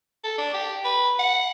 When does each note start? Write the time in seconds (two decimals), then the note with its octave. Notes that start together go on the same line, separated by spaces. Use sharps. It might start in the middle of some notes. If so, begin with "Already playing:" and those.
0.24 A4
0.38 D4
0.53 G4
0.85 B4
1.19 F#5